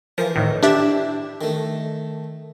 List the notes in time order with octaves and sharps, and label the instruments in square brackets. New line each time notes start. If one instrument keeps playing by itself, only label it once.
[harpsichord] E3 A#4 [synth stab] F3
[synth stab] A2 D#3
[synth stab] D4 G4 E5 [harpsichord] E4
[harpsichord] D#3 A3